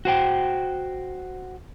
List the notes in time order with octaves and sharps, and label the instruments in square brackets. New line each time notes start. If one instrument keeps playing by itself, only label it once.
[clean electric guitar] F#4 C5 G5